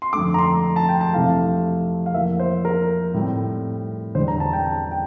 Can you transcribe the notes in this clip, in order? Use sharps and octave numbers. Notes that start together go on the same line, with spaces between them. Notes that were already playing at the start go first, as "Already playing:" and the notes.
C6
F2 D3 A3 D6
A#5
C6
A5
G5
A5
F2 C3 E3 A3 F5
F5
F2 E3 A#3 E5
C5
A#4
A2 G3 C4
E2 D3 G3 D4 C5
A#5
A5
G5
A5
G5